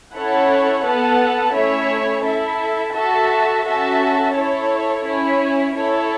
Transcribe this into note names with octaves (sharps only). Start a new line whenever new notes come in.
C#4 E4 A4 C#5 F#5
B3 A4 F#5 A5
A3 C#4 E4 C#5 E5
E4 A4 E5
F#4 A4 E5 A5
C#4 F#4 A4 E5 A5
E4 A4 C#5
C#4 E4 C#5
E4 A4 C#5